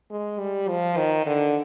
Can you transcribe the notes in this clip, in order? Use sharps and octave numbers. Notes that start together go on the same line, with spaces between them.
G#3
G3
F3
D#3
D3